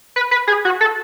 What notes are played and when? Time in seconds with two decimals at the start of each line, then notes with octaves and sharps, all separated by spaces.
0.16 B4
0.31 B4
0.47 G#4
0.65 F#4
0.81 A4